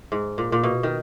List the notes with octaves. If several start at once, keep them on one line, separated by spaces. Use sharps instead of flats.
G#2
A#2
A#2
B2
D#3